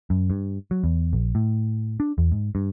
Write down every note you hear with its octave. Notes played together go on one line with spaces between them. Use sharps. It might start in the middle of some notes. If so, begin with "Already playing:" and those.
F#2
G2
F#3
E2
A#1
A2
D4
E2
G#2
G2